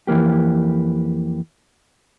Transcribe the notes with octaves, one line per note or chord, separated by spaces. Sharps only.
F2 E3 F#3 A#3 G4